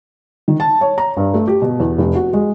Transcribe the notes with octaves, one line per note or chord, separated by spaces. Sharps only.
D#3
A5
C#5
A#5
G2
A3
G4
B2
E2
F1
F#4
G#3